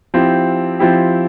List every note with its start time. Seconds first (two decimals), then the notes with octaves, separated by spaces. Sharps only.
0.14 F3 C4 E4 G4
0.79 F3 C4 E4 G4